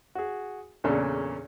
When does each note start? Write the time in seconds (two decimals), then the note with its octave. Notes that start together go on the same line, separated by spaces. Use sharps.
0.15 F#4 G#4
0.84 E2 A#2 C#3 C#4 D4 A4